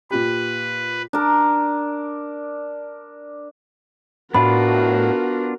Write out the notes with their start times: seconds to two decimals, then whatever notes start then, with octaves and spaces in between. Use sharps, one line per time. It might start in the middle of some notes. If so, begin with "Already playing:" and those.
0.11 A#2 F4 G4 B4
1.13 D4 A#4
4.34 A2 B3 D4 F4 F#4 A#4 B5